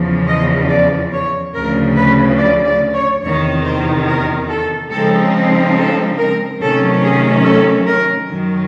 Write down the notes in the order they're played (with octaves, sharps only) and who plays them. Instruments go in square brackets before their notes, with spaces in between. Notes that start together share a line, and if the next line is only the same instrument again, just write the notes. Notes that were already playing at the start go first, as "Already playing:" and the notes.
Already playing: [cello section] E2 C#3 F3
D#5
D5
C#5
D2 C#3 F3 A#4
B4
D5
D5
C#5
E2 C3 D#3 C#5
C5
A#4
A4
C#3 F3 G#3 C4 D#4 A4
A4
A#4
C3 D#3 F#3 A3 C#4 A4
G#4
A4
A#4
F#2 D#3 F#3